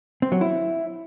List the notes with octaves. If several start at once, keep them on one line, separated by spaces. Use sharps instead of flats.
C4
F#3
E4